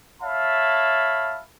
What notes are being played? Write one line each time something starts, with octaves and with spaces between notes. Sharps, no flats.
C#5 E5 F5 A5 B5